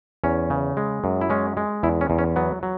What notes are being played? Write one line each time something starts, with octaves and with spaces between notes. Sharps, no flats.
E2 C#4
C#3
G#3
F#2
E4
G#3 C#4
G#3
E2 E4
C#4
E2
C#4
F#3 B3
F#3